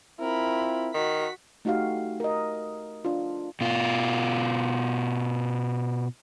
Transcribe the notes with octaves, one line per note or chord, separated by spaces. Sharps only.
C4 E4 F4 A#4 B5
D#3 F#4 B6
A3 D#4 F#4 G4 F5
A#4 D#5
D4 F4
B2 F4